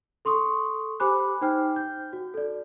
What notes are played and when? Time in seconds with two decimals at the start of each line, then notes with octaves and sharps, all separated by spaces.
0.25 A4 C6 C#6 D#6
1.00 G4 C5 G#5 B5 D6 F#6
1.41 D#4 C5 G5 F6
1.76 G6
2.13 F#4
2.34 A4 D5